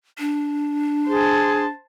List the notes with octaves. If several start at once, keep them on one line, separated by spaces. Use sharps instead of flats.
D4
G#4 C5 A5